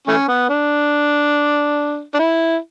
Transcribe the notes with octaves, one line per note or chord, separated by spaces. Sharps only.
E3 A3 C#4
B3
D4
D4
E4